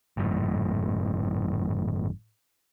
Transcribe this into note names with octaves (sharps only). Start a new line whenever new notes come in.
G#1 F#2 A2